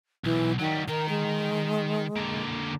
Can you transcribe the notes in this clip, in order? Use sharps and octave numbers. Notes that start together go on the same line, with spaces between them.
B1 E3
D#3 F#3 G3
D#3 A#4 A#5
G#3
D3 A#3